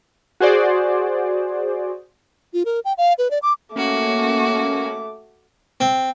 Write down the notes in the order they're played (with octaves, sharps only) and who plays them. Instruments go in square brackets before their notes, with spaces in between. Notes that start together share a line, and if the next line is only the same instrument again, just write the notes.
[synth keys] F#4 G#4 C5 D5
[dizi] F4
A#4
G5
F5
B4
D5
D6
[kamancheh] A3 D6 [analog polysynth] A#3 C#4 [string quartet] F#4
[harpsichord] C4